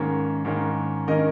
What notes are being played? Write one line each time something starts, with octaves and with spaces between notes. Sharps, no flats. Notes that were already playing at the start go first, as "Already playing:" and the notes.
Already playing: G#2 D#3 A#3 C#4
G#2 D#3 A#3 C#4
D#3 A#3 C#4 A#4 D#5